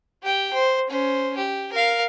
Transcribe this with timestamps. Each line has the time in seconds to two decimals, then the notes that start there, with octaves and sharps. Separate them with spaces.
0.23 G4 G5
0.53 C5
0.89 C#4 C5
1.37 G4
1.73 A#4 F5